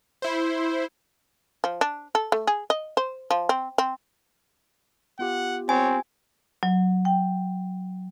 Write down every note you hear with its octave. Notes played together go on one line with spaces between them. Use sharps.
E4 C5
F3
D4
A4
A3
G#4
D#5
C5
F3
C4
C4
B3 F4 G4 F#5
C4 C#5 G#5
F#3
G5